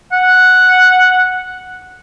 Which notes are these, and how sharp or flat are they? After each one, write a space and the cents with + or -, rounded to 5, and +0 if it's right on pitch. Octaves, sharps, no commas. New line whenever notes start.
F#5 -5